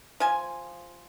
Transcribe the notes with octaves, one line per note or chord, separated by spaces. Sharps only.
F3 G#5